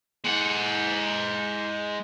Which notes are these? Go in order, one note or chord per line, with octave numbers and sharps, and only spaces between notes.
G#3 F#5